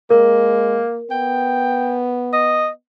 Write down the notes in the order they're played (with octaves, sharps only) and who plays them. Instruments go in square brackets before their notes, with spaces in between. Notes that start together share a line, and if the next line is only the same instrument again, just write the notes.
[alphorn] G#3 [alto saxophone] A#3 [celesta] A#4
[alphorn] B3 [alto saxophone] G5
[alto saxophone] D#5